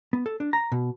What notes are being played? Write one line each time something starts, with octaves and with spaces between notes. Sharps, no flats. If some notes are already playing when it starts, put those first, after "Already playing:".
B3
A4
D4
A#5
B2